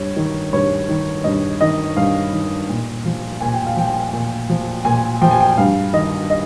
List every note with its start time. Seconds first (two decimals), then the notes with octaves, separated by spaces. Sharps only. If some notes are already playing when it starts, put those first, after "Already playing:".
Already playing: G2 C#5
0.16 D#3
0.53 G2 C#5
0.89 D#3
1.24 G2 D#5
1.61 D#3 D#5
1.97 G2 F5
2.33 D#3
2.69 A#2
3.05 F3
3.41 A#2 G#5
3.54 G5
3.66 F5
3.77 F3 G5
4.13 A#2
4.50 F3
4.85 A#2 G#5
5.22 F3 G5
5.31 G#5
5.40 G5
5.57 G2 F5
5.93 D#3 D#5
6.30 D#5